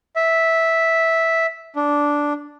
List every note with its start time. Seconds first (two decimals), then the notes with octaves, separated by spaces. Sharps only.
0.16 E5
1.76 D4